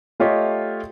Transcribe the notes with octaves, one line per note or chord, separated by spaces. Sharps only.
A3 F4 G4 C#5 D#5